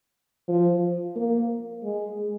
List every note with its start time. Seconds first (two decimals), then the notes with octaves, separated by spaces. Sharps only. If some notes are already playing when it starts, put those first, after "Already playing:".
0.49 F3
1.16 A#3
1.84 G#3